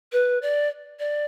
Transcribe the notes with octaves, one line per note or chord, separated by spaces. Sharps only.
B4
D5
D5